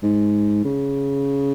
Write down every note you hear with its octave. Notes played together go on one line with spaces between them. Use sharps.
G#2
C#3